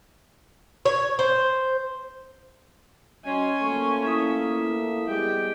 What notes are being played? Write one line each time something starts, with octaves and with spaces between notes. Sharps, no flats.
C#5
C5
F#3 C#4 D#5 G#5 C6
F3 A3 A#3 C#6
E4 E5 D#6
G3 G#3 B3 G4 G5